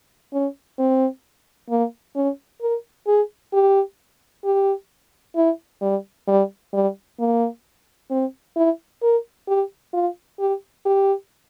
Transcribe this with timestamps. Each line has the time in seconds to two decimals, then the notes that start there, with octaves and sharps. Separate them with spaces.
0.33 C#4
0.79 C4
1.70 A#3
2.16 C#4
2.61 A#4
3.07 G#4
3.53 G4
4.44 G4
5.36 E4
5.82 G3
6.28 G3
6.73 G3
7.19 A#3
8.11 C4
8.56 E4
9.02 A#4
9.48 G4
9.93 F4
10.39 G4
10.85 G4